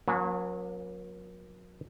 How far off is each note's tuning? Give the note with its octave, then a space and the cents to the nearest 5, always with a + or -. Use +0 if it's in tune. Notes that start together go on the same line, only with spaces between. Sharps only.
F#3 -35 A#3 +30 C#4 +0